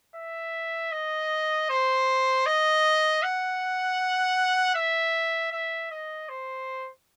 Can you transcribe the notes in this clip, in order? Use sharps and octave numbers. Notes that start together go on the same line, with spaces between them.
E5
D#5
C5
D#5
F#5
E5
E5
D#5
C5